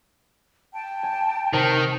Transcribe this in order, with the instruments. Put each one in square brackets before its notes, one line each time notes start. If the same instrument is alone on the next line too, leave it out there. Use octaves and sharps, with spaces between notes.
[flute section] G5 A5
[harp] G#5
[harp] C3 [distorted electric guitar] D#3